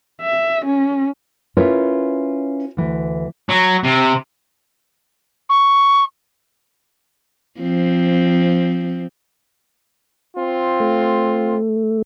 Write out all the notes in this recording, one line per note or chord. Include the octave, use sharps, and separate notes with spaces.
E5
C#4
C#4 E4 F4 A#4 B4 C#5
D2 E3
F#3
C3
C#6
F3 C4
C4 F4
A3